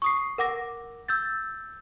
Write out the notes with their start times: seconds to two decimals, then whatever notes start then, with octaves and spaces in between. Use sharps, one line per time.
0.02 C#6 D#6 C7
0.38 A#4 F#5 D6 A#6
1.08 E6 G6 A6